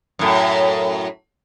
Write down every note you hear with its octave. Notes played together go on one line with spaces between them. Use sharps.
F#2 A2